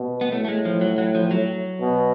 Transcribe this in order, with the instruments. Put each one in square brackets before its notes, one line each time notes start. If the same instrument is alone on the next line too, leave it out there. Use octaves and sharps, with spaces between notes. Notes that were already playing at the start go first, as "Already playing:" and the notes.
Already playing: [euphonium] B2
[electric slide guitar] B3
[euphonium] A2 [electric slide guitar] A3
[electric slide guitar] A3
G#3
F3
F#3
F#3
F3
F#3
[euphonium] B2